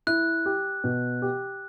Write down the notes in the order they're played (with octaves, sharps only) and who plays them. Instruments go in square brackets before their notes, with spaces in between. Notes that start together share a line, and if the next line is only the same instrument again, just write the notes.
[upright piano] E4 [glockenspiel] F#6
[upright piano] G4
B2
G4